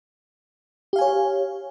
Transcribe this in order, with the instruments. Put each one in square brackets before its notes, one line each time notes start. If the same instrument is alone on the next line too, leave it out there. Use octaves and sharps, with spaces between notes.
[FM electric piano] G4
F5
G#5
C#5